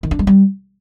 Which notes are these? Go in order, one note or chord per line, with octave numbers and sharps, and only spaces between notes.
D#3
D4
G#3
G3